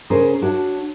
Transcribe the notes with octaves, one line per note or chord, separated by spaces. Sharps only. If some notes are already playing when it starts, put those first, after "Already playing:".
C#3 C#4 G#4 A#4 C5
D4 F#4 C#5 A5